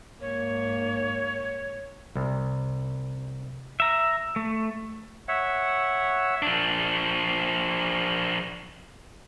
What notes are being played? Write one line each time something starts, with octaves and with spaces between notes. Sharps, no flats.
G#2 A#3 C#5
C2
E5 A#5
A3
C#5 E5 F#5
F3 D4